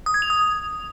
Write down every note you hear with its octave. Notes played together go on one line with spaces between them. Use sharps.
D#6
G#6
F7
D#6